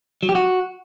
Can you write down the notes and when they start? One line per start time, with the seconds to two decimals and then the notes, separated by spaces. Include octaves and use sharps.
0.23 F#3
0.29 G4
0.35 F#4